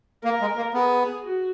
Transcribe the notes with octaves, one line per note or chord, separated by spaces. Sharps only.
A#3 A#4
G#3
A#3
B3 G#4
F#4